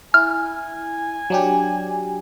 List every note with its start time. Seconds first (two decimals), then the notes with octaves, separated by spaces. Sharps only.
0.14 E4 G#5 F6
1.30 F#3 D4 G4